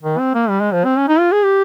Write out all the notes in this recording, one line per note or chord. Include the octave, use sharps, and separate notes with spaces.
D#3
C4
A#3
G3
G#3
F3
C4
C#4
D#4
F4
G#4
G4